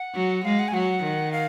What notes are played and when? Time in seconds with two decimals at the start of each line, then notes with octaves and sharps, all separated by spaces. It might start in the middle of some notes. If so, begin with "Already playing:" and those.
Already playing: F#5
0.15 F#3
0.45 G#3 F5
0.59 F#5
0.68 G#5
0.74 F#3 F#5
1.03 D#3
1.32 F5